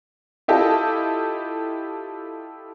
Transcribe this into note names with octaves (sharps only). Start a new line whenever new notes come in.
E4 F4 G4 A4 D#5 A5